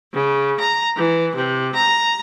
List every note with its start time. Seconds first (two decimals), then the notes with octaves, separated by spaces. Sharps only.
0.12 C#3
0.58 A#5
0.96 E3
1.33 C3
1.74 A#5